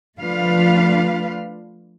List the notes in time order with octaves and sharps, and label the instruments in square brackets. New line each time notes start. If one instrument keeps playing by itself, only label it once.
[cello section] F3 A3 D4 F4 B4 F5